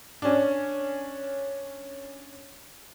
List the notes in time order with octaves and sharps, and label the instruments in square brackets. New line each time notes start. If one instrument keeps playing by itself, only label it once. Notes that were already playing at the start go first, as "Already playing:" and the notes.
[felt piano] C#4 D4